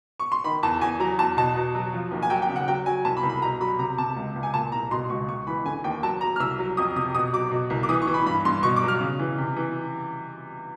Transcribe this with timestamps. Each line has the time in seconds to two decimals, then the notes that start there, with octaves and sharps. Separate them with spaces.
0.20 C#6
0.32 C6
0.44 D#3 B5
0.63 E2 A5
0.81 E2 G#5
1.00 F#3 A#5
1.19 E2 A5
1.37 B2 A5
1.56 B2
1.75 F#3
1.94 F3
2.11 D#2
2.23 G#5
2.30 F#3 G5
2.42 G5
2.49 C#3
2.56 F#5
2.68 F#3 G5
2.86 F#3 G#5
3.05 C2 A5
3.17 B5
3.23 C2
3.29 B5
3.42 B2 A#5
3.60 F#3 B5
3.79 C3 A#5
3.98 C3 A5
4.16 C#2
4.35 C#2
4.43 G#5
4.54 A#2 A5
4.72 C2 A#5
4.91 B2 C6
5.10 C#2 C#6
5.28 C#2 C#6
5.47 E3 B5
5.65 D3 G#5
5.84 D#2 G5
6.03 F#3 A5
6.21 F#3 A#5
6.36 F6
6.40 C2 E6
6.59 F#3
6.77 F2 D#6
6.96 C3 D#6
7.15 B2 D#6
7.33 F#3 D6
7.52 B2
7.70 C2
7.83 D6
7.89 E3 D#6
8.02 C#6
8.07 E3
8.14 B5
8.26 G2 B5
8.45 G2 C6
8.63 B2 C#6
8.76 D6
8.83 F#3
8.88 F6
9.01 C#3
9.19 E3
9.38 C3
9.56 E3